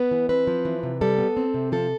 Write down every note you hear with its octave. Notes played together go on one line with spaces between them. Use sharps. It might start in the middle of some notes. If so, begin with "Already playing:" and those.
Already playing: B3 B4
E3
C4 B4
F3
E3
C3
G3 A4
B3
C4
C3
F3 A4